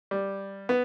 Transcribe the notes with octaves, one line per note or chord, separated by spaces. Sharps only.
G3
B3